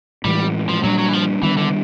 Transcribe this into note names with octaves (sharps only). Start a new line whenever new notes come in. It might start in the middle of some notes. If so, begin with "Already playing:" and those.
A2 E3 G3 G#3
F3
A#2 F#3 G3 A#3 D4
F#3
E3
F3
D#3 E3 G3 B3 D4
D3